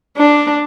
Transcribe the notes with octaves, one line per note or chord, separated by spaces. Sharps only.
D4